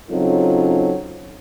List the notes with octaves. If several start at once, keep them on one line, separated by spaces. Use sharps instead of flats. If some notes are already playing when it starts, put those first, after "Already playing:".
C#3 F#3 C4 D#4 F4 A4